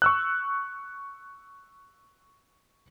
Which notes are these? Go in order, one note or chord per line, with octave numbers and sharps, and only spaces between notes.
C#6 E6 F#6